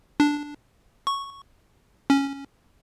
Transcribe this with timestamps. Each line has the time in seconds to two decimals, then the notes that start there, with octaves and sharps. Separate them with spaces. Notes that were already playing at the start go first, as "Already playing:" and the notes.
0.20 D4
1.07 C#6
2.10 C#4